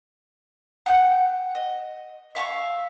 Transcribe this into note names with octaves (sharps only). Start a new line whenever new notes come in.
F#5 G5 D6 G6
D#5
E5 F5 A5 C#6